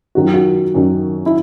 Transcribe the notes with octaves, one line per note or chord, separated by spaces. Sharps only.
F#2 D#3 F#3 F#4
F4
F#4
F#2 D#3 F#3
E4